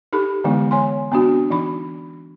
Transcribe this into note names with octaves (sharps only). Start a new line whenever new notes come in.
D#4 G4 A4 B5
D3 E3 G#3 B3 D#4
C#5 G#5 C6
B3 C4 D4 F#4
E3 D#4 B5